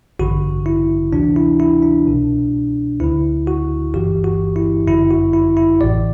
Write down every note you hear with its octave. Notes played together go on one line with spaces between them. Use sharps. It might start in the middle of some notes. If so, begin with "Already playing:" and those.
A1 G2 D3 F#4
E4
D2 C3 E3 D4
E4
E4
D4
C2 B2
D2 D3 E4
F#4
G1 G2 E3 G4
F#4
E4
G1 F#2 D3 E4
F#4
E4
E4
A1 A2 E3 D5